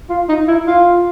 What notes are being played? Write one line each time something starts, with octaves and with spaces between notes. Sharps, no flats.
F4
D#4
E4
F4